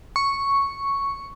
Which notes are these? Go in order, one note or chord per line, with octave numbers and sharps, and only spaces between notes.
C#6